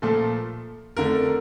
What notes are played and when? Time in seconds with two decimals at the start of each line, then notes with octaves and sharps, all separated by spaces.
0.02 A#2 F3 A3 A4
0.97 F2 D3 A3 A#4